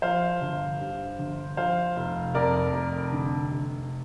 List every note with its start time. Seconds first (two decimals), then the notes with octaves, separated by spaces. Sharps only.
0.02 F3 C5 F5
0.41 G1
0.80 G2
1.19 G1
1.57 F3 C5 F5
1.96 F1
2.34 F2 A#4 D5
2.73 F1
3.13 D3
3.50 F1